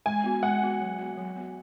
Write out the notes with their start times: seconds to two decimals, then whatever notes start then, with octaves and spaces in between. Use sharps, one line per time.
0.06 G#3 G#5
0.24 B3 F#4
0.43 G#3 F#5
0.62 B3 F#4
0.81 F#3
0.98 B3 F#4
1.18 F#3
1.36 B3 F#4